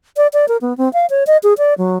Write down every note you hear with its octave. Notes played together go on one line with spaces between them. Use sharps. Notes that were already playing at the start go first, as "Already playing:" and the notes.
D5
D5
A#4
B3
C4
F5
C#5
D#5
G#4
D5
F#3